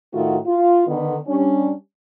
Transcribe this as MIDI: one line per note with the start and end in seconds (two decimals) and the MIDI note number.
0.14 0.38 45
0.14 0.38 51
0.14 0.38 57
0.14 0.38 65
0.14 0.38 66
0.46 0.85 65
0.87 1.17 50
0.87 1.17 51
0.87 1.17 59
1.27 1.72 55
1.27 1.72 61
1.27 1.72 62